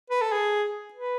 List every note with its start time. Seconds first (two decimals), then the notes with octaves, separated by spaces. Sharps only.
0.10 B4
0.21 A4
0.32 G#4
0.94 B4